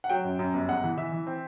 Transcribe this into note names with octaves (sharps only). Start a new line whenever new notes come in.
F#5
F#3 G5
F#2
F#2
G1
E2 F#5
E3
E3 E5
E3
C4